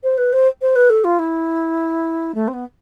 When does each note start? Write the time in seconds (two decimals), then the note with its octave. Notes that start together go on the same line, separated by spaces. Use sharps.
0.03 C5
0.18 B4
0.33 C5
0.61 C5
0.75 B4
0.90 A4
1.04 F4
1.19 E4
2.35 A3
2.48 C4
2.53 B3